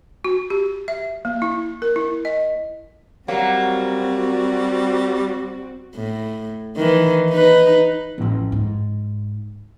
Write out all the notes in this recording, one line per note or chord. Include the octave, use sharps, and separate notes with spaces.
F#4
G4
E5
A#3
E4
A#4
E4
D#5
F#3 G3 A#3 C4 F#4
A2
D#3 E3
D#4 B4
A1 F2
G#2